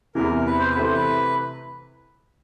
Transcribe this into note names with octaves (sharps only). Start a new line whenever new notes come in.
E2 C3 E3 A#4
B4
C5
B4
C3 E3 A3 C4 C5
B4